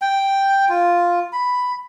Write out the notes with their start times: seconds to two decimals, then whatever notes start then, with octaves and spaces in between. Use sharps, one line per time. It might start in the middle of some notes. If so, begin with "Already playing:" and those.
0.02 G5
0.69 F4
1.33 B5